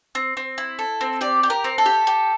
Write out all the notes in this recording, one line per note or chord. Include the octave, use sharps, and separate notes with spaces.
C4
C4
E4
A4
C4
G4 D5
G4
A#4
C4
A4
G4
G4